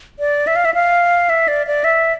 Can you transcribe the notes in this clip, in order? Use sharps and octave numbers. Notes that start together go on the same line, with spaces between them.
D5
E5
F5
E5
F5
E5
D5
D5
E5